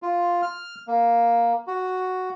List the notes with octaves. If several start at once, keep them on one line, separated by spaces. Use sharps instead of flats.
F4
F6
A#3
F#4